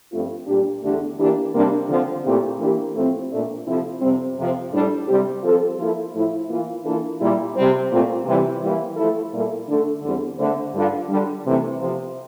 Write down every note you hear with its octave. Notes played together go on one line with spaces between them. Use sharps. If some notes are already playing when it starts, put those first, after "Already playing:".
G2 F3 A3 C4 F4
A#2 G3 D4 G4
E2 D3 A3 D4 G4
E3 A#3 D4 G4
C3 G3 A#3 D4
D3 F3 C4
A#2 A3 C4 E4 G4
E3 A#3 D4 G4
A2 F3 A3 C4
A#2 A3 D4
C3 F3 C4 E4 A4
F2 C3 G3 C4
F2 C3 F3 C4
A2 G3 D4 A4
C3 G3 C4 G4
F3 C4 F4 A4
F3 A#3 E4 A4
A2 F3 A3 E4
E3 A#3 F4
E3 A#3 D4 F4 A4
A#2 G3 A#3 E4 G4
C3 G3 C4
A#2 A3 C4 F4
C3 E3 G3
E3 G3 A#3 E4
F3 A3 E4 A4
A#2 G3 A#3 E4 A4
D3 A3 D4 A4
E2 D3 G3 C4
D3 A3 C4
G2 D3 G3 D4 F4
D3 G3 D4
C3 E3 A3
C3 F3 C4